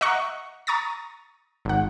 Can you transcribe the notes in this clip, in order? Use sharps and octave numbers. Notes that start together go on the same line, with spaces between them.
D#5 E5 F#5 A#5 C#6 F#6
A#5 C#6 D#6 A6 A#6
G#1 F#5